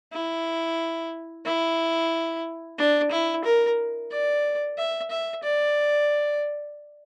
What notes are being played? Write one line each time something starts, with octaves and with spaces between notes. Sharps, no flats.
E4
E4
D4
E4
A#4
D5
E5
E5
D5